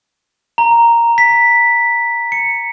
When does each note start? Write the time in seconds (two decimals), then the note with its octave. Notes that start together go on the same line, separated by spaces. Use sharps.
0.58 A#5
1.18 B6
2.32 C#7